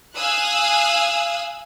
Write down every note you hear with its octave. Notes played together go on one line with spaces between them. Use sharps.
F5 G#5 D#6 E6 F#6